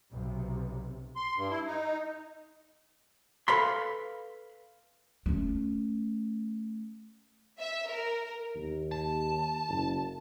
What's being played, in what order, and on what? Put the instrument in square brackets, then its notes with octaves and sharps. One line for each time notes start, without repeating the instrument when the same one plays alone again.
[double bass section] B1 C3
[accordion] C6
G2
E4
D#4
[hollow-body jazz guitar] A4 B4 F5 B5 C6
[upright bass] A3 C#4
[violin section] E5
A#4
[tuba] D#2
[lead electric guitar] A5
[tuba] F#1